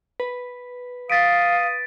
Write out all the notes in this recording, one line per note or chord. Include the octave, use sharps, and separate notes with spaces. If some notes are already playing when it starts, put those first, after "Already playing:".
B4
F5 D#6 A6 B6 D7